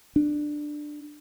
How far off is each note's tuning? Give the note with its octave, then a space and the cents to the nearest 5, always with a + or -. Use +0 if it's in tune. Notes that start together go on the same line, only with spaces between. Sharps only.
D4 +15